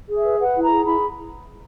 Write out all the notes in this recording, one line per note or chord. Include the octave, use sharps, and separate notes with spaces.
G#4
E5
B4
B4 F#5
E4
A#5
G#4
E4 B5